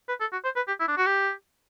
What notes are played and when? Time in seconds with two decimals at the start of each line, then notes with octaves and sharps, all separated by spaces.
0.09 B4
0.21 A4
0.32 F#4
0.44 C5
0.56 B4
0.68 G4
0.80 E4
0.88 D4
0.98 F#4
1.06 G4